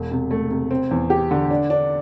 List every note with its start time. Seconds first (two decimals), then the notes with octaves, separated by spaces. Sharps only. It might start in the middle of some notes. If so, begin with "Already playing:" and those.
Already playing: E1
0.11 C3
0.31 A3
0.50 C3
0.71 C4
0.91 E2
1.10 G4
1.31 D3
1.51 D4
1.70 D4